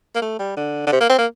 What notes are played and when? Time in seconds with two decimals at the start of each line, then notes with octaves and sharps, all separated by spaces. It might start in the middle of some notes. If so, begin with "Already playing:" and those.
0.15 A#3
0.21 A3
0.39 G3
0.57 D3
0.86 D3
0.92 C3
1.00 A#3
1.09 C4
1.18 A#3